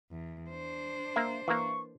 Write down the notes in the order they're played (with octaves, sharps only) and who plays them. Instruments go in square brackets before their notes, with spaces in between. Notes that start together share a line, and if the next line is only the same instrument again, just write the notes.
[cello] E2
D4 C5
[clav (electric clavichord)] A#3 E5
[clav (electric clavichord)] E3 A#3 [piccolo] C#6